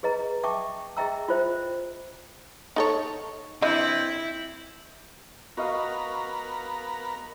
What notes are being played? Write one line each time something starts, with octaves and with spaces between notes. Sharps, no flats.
G#4 B4 D#5 A#5
E5 G5 A5 C#6 D6
G#4 D#5 E5 G5 A#5 E6
F4 C5 E5
D#4 A4 C#5
E3 C4 D4 E4 D#5
B3 F#4 A#4 D#5 F5